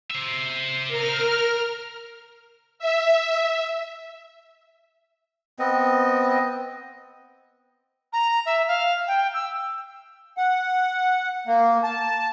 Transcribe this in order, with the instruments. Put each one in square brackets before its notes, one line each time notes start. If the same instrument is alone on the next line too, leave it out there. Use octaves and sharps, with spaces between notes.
[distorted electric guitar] C5 E5
[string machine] A#4 F6
E5
[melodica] B3 C4 D#5
[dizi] A#5
E5
F5
G5
E6
[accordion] F#5
A#3
A5